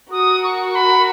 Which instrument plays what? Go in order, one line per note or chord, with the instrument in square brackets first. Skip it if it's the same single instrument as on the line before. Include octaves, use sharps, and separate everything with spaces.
[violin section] F#4 A#4 [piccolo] D#6
[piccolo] C#6
B5